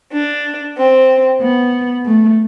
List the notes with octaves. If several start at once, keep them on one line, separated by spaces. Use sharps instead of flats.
D4
C4
B3
A3